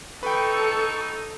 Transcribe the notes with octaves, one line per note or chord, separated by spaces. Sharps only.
D#4 A4 B4 G5 C#6